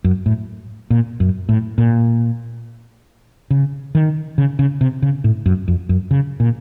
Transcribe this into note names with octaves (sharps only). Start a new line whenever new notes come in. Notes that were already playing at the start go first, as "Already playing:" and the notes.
F#2
A2
A#2
F#2
A2
A#2
C#3
D#3
C#3
C#3
C3
C#3
A2
F#2
F2
F#2
C#3
A#2